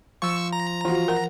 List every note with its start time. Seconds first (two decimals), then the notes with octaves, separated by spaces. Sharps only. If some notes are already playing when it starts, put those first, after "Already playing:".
0.22 F3 C#6 E6
0.53 A#5
0.85 E3 F4 F#4
1.08 A#4 F#5